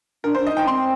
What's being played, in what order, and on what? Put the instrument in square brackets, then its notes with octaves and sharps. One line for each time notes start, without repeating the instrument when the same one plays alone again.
[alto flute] D4 [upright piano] A#4
[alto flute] D4 [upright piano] C5
[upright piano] D#5
[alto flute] D#4 [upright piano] G5
[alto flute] C4 [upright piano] C6